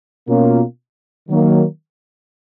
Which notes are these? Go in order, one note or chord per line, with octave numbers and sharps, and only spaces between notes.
B2 A#3 C#4 F4
D#3 F#3 A#3